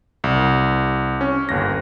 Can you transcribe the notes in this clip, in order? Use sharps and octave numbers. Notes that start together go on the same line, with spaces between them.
C2
C#4
G1 D#2 A#6